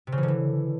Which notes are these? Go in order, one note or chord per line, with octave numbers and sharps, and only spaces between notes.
C3
C#3
E3
D3
E3